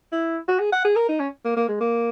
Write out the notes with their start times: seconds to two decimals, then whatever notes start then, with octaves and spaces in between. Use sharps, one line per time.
0.12 E4
0.48 F#4
0.60 G#4
0.72 F#5
0.84 G#4
0.96 A#4
1.09 D#4
1.20 C#4
1.45 A#3
1.56 A#3
1.68 G#3
1.80 A#3